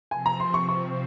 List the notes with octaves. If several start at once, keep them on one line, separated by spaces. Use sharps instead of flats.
C3 F3 C4 G#5
A#5
C6
C#6
C#6